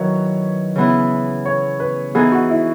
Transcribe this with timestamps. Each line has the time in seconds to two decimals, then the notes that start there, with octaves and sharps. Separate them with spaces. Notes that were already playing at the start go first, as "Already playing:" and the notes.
Already playing: D#3 F#3 E4 B4 C#5
0.76 C#3 E3 B3 E4
1.45 C#5
1.80 B4
2.15 E3 B3 D#4 G#4
2.32 F#4
2.50 E4